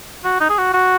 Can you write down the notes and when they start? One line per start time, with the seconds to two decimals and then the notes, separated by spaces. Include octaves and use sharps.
0.24 F#4
0.40 D#4
0.49 G#4
0.58 F#4
0.74 F#4